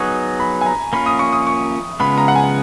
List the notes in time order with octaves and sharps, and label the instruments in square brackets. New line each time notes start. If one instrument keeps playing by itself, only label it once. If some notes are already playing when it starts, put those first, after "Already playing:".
Already playing: [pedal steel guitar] F#3 B3 D#4 G#4 [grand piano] C#6
[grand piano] B5
G#5
A#5
[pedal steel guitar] A#3 C#4 F4 [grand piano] B5
[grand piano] D#6
C#6
D#6
C#6
[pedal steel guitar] C#3 G#3 B3 F4 [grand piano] B5
[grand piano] A#5
F#5
G#5